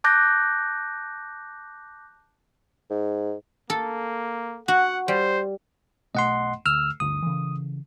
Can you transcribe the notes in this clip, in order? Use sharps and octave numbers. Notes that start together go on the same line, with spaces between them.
A5 D6 F#6 G6 A#6
G#2
A#3 A4
F#4 F#5
G3 C5
B1 B2 A3 D#5 F#5 C6
D2 E6 F6
D2 G2 D3 D#6
C#3 E3